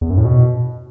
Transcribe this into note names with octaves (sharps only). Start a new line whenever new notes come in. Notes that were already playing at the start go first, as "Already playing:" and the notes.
E2
F#2
A2
B2